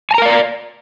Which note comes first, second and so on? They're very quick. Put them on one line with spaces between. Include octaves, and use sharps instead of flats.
G#5 A#5 A#4 F5 D5